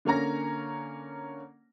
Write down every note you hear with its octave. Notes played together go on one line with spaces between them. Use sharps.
D3 A#3 C#4 A#5 A#6